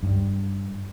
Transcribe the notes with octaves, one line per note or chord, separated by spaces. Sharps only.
G2